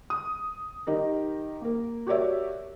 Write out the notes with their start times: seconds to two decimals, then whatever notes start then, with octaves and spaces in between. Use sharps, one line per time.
0.10 D#6
0.87 D#3 D#4 G4 A#4
1.61 A#3 A#4
2.07 F#4 G4 A#4 C#5 D5 E5